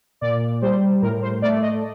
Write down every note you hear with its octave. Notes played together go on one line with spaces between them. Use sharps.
A#2 D5
G3 C5
A2 A#4
C5
A3 D5
D#5